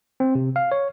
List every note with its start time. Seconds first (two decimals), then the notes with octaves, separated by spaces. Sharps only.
0.20 C4
0.35 C3
0.56 F5
0.72 C#5